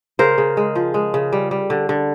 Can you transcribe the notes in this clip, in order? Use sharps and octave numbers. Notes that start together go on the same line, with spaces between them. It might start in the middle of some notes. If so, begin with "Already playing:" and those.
C#3 A#4 C5
C#3
G#3
F3
G#3
C#3
G3
G3
D3
D3